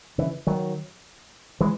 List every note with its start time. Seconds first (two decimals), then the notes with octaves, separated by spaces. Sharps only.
0.18 C#3 E3
0.47 D#3 F#3
1.61 E3 G#3